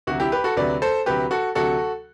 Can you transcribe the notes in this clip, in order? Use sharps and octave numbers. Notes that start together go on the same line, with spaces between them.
D2 C3 F#3 F#4
E4 G4
G4 B4
F#4 A4
D2 C3 F#3 B4 D5
A4 C5
D2 C3 F#3 G4 B4
F#4 A4
D2 C3 F#3 F#4 A4